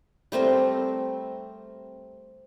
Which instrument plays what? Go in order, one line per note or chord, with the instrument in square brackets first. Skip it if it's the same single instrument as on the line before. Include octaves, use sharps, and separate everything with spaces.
[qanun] G3 A3 C4 A#4